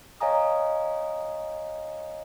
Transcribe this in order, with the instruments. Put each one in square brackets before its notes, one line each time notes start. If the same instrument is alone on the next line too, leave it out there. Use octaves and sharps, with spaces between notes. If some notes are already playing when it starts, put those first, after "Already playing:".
[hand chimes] C#5 D#5 F5 G#5 A#5 D#6